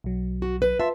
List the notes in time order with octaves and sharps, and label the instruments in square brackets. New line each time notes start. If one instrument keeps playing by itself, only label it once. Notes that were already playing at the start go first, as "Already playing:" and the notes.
[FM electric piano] B1 F#3
[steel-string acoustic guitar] F#4
B4
[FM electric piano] F4 A5 C6 [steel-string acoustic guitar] E5